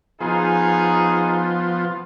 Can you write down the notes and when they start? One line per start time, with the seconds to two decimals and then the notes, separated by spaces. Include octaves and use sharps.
0.21 F3 B3 D#4 F4 G#4